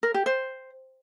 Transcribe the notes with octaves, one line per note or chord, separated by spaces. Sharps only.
A#4
G4
C5